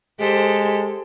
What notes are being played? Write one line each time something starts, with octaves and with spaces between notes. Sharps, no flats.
G#3 G4 A4 C5